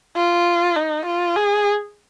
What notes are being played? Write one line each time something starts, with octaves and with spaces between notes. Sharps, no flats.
F4
D#4
F4
G#4